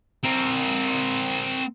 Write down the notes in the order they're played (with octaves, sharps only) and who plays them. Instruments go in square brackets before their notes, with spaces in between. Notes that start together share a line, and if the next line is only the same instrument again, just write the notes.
[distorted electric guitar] C4 A#4